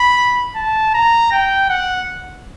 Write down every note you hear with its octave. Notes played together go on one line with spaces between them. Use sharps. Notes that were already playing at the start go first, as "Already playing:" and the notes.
Already playing: B5
A5
A#5
G5
F#5